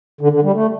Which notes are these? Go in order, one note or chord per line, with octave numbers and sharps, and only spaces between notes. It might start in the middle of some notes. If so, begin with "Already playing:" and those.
D3
D3
G3
A3